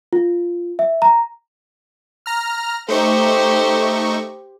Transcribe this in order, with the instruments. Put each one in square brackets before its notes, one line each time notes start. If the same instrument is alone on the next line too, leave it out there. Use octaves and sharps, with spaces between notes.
[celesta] F4
E5
A#5
[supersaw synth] A#5 F6
[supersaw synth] A3 D#4 C#6 [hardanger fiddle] G4 C5